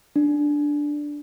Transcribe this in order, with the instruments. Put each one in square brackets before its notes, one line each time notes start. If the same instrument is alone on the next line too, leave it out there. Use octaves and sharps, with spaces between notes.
[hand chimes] D4